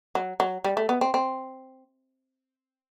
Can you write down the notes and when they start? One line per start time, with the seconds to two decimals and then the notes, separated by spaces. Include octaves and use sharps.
0.15 F#3
0.40 F#3
0.64 G3
0.77 A3
0.89 B3
1.01 C4
1.14 C4